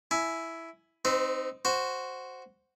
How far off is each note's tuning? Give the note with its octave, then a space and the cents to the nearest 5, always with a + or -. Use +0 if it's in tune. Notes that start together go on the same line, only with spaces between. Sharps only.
E4 +0 G#5 +15
C4 +0 D#4 +0 C5 -40
F#4 +0 C5 +0